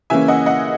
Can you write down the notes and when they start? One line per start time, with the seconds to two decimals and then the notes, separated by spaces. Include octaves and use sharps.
0.10 C#3 E3 A#3 C#4 E5 G#5
0.28 D#5 F#5
0.46 D#5 F#5